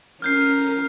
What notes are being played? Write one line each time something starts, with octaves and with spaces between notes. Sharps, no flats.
C#4 A#4 F6 G6 C7